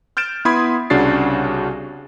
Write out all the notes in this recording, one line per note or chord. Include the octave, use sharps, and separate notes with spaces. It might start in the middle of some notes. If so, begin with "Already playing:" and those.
F6 G6 A6 D7 E7
B3 E4 B5 C6 D#6 G#6
C2 C#3 D4 F#4 A6 C7